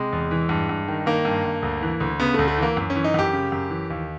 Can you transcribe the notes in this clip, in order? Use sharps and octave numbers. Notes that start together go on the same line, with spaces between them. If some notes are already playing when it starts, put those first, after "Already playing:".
Already playing: C3 G#3
E2
E3
G2
G2
D#3
D#3 A#3
G2
G2
D2
E3
D2
C#3 B3
D2 A3
A3
E3 A#3
F#2
C#4
E3
D#4
F#2 G4
C#3
F#2
E3
D#2